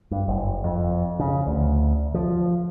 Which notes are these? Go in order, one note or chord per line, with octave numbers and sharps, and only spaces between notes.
G2
F#1
F2
C#3
D2
F3